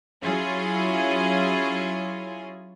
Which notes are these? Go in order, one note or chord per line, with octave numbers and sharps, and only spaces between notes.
F#3 C#4 E4 F4 G#4